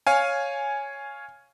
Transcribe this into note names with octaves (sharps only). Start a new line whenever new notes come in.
C#5 F5 G#5